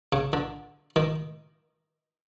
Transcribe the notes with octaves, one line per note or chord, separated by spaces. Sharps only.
C#3
D3
D#3